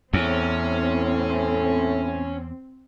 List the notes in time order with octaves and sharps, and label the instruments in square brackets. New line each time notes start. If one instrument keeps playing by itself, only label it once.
[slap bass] E2 [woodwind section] A2 [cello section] C4 [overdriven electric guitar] C#4